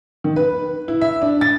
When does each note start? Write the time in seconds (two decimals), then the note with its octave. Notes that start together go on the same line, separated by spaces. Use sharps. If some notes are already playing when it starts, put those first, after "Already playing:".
0.24 D#3
0.36 B4
0.88 E4
1.01 E5
1.22 D4
1.41 A6